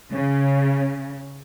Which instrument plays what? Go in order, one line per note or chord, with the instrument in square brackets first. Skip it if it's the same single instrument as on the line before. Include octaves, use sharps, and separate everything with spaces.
[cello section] C#3